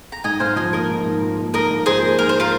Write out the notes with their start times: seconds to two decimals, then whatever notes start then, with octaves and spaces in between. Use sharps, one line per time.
0.12 A#5
0.24 G#2 D#5 G#5
0.40 G#2 C5 F5
0.56 F3 D#5 G#5
0.73 A#3 A#4 D#5
0.89 G#2
1.05 G#2
1.22 F3
1.38 A#3
1.54 G#2 A#4 D#5
1.71 G#2
1.86 F3 G#4 C5
2.02 A#3
2.19 G#2 A#4
2.29 C5
2.40 F4 A#4